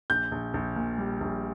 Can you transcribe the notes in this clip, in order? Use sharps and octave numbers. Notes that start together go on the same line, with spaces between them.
A#1 G6
A#1
A#1
A#2
G3
A#1